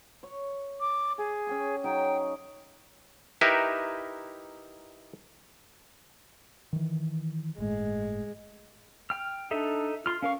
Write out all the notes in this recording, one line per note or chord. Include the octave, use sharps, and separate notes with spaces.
C#5
D6
G#4 G#5
C#4 G5 C#6
F#3 D#4 G#4 G5
D#4 E4 G4 A#4 B4 E5
D#3 E3
G1 A2 G#3
G5 F6
D4 D#4 A4 E5
F4 C6 F6
C#4 A#4 F5 C#6